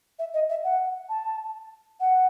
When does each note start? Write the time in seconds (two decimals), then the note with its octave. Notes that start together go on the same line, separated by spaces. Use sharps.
0.18 E5
0.33 D#5
0.49 E5
0.64 F#5
1.09 A5
2.00 F#5